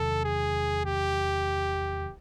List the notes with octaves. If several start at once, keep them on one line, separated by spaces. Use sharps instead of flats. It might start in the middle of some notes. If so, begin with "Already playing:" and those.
Already playing: E2 C3 D#3 F#3 A4
G#4
G4